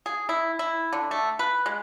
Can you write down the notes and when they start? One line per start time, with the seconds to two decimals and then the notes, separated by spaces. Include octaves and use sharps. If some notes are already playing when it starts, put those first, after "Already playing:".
0.06 G#4
0.29 E4
0.59 E4
0.93 D3
1.11 A3
1.39 B4
1.66 G#3